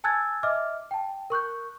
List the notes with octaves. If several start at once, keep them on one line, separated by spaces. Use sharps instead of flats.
G#5 A5 E6 F#6 G#6 A6
D#5 E5 D6 F6
G5 A5
A#4 C#6 F#6 G6